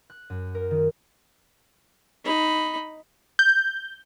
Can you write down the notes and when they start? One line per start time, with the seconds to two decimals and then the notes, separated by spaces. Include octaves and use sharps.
0.10 F#6
0.30 F#2
0.55 A#4
0.71 D#3
2.24 D#4 B5
3.39 G6